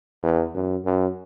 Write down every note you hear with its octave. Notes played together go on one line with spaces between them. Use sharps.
E2
F#2
F#2